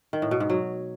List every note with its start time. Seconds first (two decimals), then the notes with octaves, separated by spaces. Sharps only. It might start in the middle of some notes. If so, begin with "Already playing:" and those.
0.13 D#3
0.22 A2
0.31 B2
0.40 G#2
0.50 F#3